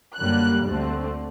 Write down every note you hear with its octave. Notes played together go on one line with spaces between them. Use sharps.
F#2 D3 G3 A#3 F#6
D2 D3 A3 C4